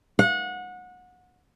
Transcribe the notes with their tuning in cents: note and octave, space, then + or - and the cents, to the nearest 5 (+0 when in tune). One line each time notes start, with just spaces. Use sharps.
F#5 -25